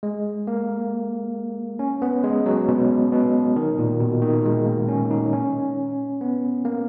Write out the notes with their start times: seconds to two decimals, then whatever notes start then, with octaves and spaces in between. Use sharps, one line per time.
0.03 G#3
0.47 A#3
1.79 C#4
2.02 B3
2.24 G#3
2.46 F#3
2.68 B2
3.12 B2
3.56 D#3
3.78 A#2
4.00 B2
4.22 D#3
4.45 G#3
4.66 A#3
4.89 C#4
5.11 D#4
5.33 C#4
6.21 B3
6.65 A#3